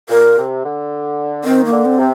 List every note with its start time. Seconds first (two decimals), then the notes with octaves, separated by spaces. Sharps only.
0.09 A#2 A#4
0.37 C3
0.63 D3
1.44 D#3 C4
1.65 A#3
1.71 D3
1.85 C4
1.98 C3